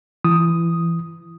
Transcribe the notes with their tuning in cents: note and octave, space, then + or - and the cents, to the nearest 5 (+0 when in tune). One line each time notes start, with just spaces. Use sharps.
E3 +25 D#6 +0